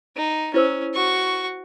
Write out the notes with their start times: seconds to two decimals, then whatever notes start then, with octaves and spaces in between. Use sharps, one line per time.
0.16 D#4
0.54 C#4 E4 C5 E6
0.94 F#4 C#6